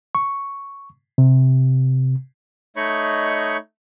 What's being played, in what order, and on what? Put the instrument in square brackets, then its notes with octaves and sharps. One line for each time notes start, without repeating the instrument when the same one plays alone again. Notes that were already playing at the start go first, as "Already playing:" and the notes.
[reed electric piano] C#6
C3
[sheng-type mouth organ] A3 D#4 C#5 D#5 B5 C#6